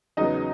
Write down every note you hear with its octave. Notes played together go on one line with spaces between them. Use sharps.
E2 C#3 F#3 B3 D#4 D#5